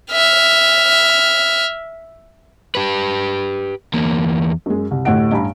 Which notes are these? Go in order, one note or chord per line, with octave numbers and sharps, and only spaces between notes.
E5 F6
G4 B4
E2 A#3
F#2 G#3
C2
D2 A2 G4 D#5 F#5 D7
A1 G2 G#5 A#5 B5